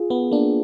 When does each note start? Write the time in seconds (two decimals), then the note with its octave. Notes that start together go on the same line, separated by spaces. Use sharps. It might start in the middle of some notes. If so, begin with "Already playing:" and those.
Already playing: F4 G#4
0.10 B3
0.31 A#3 D4